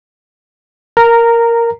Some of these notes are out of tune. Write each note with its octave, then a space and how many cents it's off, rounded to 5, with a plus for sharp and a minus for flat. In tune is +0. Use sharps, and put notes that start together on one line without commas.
A#4 +0 A#5 -15